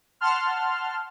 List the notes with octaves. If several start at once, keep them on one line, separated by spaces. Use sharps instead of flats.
F#5 A5 C6 F6